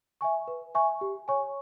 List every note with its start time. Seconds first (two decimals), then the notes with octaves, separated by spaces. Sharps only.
0.21 E5 G#5 C#6
0.48 B4
0.75 E5 G#5 C#6
1.01 G4
1.28 C#5 G#5 C#6